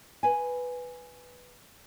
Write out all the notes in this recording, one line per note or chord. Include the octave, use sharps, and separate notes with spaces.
B4 G#5